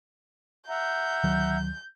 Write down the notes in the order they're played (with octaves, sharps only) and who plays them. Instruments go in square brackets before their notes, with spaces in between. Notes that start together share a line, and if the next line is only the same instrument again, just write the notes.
[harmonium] E5 F#5 A#5 [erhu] G6
[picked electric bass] D2 D#3 F#3